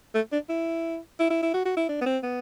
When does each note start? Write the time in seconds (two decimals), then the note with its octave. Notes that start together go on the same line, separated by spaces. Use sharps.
0.14 A3
0.32 D4
0.49 E4
1.19 E4
1.30 E4
1.42 E4
1.54 F#4
1.65 F#4
1.77 E4
1.89 D4
2.01 B3
2.06 C4
2.23 B3